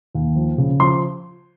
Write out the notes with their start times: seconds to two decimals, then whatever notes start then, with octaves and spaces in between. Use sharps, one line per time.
0.15 D#2
0.36 F3
0.58 C#3
0.80 F3 C6